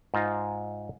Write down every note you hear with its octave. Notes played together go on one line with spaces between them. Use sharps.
G#2 D#4 F4 A#5